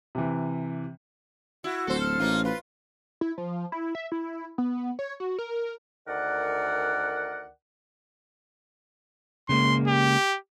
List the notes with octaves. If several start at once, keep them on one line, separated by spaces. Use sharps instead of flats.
C3 E3
E4 F#4
D1 A4 C5
F6
A1 A#3 D#4 F4
F4 B4
E4
F3
E4
E5
E4
B3
B3
C#5
F#4
A#4
D2 D#3 A#4 D5 F#5
C#3 G#3 A#3 C6
G4